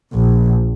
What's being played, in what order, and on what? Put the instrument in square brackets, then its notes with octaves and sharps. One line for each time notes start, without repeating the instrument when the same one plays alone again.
[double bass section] A#1